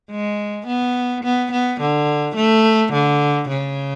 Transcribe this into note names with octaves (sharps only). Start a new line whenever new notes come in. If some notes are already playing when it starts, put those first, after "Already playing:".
G#3
B3
B3
B3
D3
A3
D3
C#3